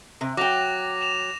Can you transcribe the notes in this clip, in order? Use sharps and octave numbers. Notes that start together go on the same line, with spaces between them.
C3
F#3 G5 D6 A#6 F7
E7 F7